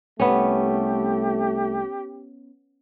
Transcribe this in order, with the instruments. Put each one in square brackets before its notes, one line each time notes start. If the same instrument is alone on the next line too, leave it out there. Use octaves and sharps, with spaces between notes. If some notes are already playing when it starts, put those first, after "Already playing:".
[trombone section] C2 A3 [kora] B3 C#4 [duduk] G4